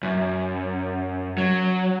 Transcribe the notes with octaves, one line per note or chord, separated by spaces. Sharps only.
F#2
F#3